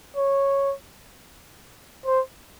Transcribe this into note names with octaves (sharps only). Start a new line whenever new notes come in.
C#5
C5